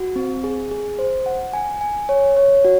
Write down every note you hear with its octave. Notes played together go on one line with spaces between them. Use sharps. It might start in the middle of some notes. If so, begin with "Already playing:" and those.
Already playing: F#4
C4
G#4
G#4
C5
F#5
G#5
G#5
C#5
C#5
F#4